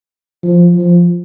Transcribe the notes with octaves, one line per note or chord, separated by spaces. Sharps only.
F3
F3